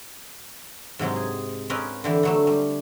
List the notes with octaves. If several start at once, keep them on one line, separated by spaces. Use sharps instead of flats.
G#2 C3 F#3 G#3
G#4
C4 C#4 A#4 B4 D#5 F5
D3 E3 G4
D3 F#3 A3
G3